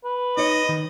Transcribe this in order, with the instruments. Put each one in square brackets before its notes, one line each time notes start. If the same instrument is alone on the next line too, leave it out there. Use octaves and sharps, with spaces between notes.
[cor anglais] B4
[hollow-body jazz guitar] D#4 C#5 [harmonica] D#5
[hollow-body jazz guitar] D#3